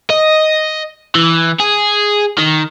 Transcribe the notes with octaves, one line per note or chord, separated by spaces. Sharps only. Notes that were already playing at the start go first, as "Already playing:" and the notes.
D#5
E3
G#4
D#3